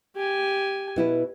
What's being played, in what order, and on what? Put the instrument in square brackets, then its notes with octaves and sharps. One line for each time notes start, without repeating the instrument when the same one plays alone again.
[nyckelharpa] G4 G#5
[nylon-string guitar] B2 E4 B4